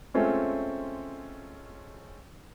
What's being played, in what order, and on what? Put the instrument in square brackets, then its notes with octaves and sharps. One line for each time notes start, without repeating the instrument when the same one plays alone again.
[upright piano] G#3 A3 C4 C#4 F4